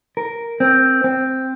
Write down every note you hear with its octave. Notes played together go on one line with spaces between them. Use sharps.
A#4
C4
C4